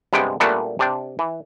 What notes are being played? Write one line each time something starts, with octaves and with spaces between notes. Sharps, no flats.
G2 C3 G#3 B3 G5
A#2 G3 A3 B3 D4 F#4
C3 D4 G5
E3